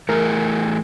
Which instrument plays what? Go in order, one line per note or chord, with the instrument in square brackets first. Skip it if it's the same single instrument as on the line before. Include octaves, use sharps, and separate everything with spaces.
[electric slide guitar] E3 A3 G#4 [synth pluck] A#4